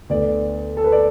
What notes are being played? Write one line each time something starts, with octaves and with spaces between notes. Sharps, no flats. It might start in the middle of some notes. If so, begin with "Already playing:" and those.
D2 D3 B3 D5
A4
B4
D5